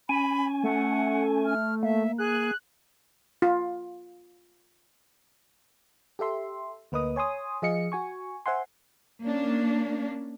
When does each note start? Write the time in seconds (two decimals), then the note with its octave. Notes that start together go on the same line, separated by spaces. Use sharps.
0.09 C#4 G#5 B5
0.63 A3 F#5
1.46 F6
1.83 A#3 E5
2.18 G#4 F#6
3.42 F4
6.19 G4 A4 E5 C6
6.92 D2 A#3 B4 D#5 D#6
7.16 C#5 G#5 C6 D#6
7.62 F3 G#4 D#5 F5 C#7
7.92 F#4 G#5 C#6
8.46 C5 E5 F#5 G#5 C6
9.23 A#3 C#4 D4